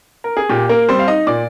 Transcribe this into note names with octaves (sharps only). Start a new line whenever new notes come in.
A#4
G#4
A#2 G4
A#3 A#4
G3 C4 C5
F5
D#4 D#5
A#2 D5 D6